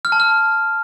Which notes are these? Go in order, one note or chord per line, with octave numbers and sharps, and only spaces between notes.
F6
A5
F6